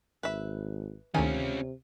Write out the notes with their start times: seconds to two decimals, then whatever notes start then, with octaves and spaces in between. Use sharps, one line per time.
0.23 G#1 B4 E5
1.14 D2 C3 D#3 C#4 F4 G#5